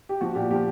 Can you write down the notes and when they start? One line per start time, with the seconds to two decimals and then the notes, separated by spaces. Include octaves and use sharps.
0.09 G4
0.21 F3 F#4
0.35 A#2 G4
0.50 F3 G4